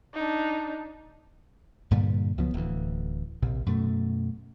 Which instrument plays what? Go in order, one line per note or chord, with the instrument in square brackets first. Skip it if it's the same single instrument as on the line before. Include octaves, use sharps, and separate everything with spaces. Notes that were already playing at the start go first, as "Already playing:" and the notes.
[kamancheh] D4 D#4
[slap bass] G2 A#2 D3 G3
C#2 F3 F#3 B3
D1 D2 E3
A#1 C3
F#2 B2 A3